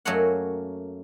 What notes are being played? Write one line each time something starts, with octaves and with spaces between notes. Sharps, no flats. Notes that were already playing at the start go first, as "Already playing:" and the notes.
F#2 A3 A#3 F#4 C#5 F#5